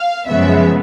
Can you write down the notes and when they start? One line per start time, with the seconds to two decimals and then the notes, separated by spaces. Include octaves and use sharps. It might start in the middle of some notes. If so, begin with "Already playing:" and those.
Already playing: F5
0.28 F#2 C#3 F3 G#3 B3 E5